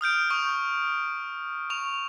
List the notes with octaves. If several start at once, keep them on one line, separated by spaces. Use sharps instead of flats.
D#6 F6 G6 D7
C#6 D#6 G6
C#6 F7